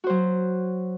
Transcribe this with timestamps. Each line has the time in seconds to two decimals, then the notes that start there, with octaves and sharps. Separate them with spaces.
0.04 F#4
0.07 C5
0.10 F#3